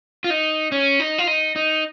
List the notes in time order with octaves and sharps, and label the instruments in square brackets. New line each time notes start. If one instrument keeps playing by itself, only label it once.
[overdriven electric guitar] F4
D#4
C#4
D#4
F4
D#4
D#4